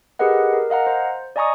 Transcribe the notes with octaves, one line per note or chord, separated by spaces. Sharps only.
G4 G#4 A#4 B4 D#5 F#5
A#4
D#5 F5 F#5 A#5
C5
D5 D#5 G#5 A#5 C#6 D#6